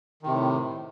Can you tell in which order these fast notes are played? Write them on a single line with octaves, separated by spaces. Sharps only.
D#3 C3 A2